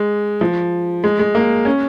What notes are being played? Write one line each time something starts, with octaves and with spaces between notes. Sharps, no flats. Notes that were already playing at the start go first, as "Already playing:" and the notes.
Already playing: G#3
F3
G#3
G#3
A#3
C#4